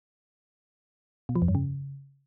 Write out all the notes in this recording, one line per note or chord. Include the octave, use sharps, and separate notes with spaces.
B2
F3
F2
G2
C#3